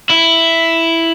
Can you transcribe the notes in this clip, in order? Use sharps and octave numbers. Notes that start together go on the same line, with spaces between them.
E4